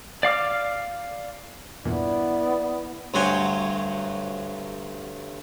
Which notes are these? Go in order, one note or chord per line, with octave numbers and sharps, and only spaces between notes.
D5 F5 D6 F6
E2 G2 A#2 B3 E4 D5
D2 G2 F#3 C5 F#5 G#5